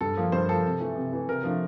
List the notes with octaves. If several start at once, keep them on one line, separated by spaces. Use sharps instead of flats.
G2 A4
F3 A#3
G2 C5
F3 A#3 A4
C3
E3 A3
C3
E3 A3
C3 A#4
F3 A3 D4